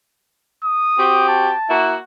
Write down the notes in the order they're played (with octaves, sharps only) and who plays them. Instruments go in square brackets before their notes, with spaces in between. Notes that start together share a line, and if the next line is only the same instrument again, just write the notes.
[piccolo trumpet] D#6
[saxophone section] C4 F#4 G4
[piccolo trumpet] A5
[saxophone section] A#3 E4 F#4